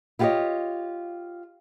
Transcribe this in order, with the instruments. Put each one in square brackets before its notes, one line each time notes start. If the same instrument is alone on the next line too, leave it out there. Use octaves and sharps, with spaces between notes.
[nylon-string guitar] E4 F4 G4 A4 C#5 D#5